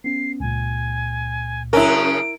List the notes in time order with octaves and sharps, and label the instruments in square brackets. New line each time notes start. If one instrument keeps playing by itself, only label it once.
[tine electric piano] B3 C#4 [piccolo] C7
[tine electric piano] C#2 A#2 [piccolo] G#5
[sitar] F#2 C#3 C#4 [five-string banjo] E4 A#4 [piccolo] D7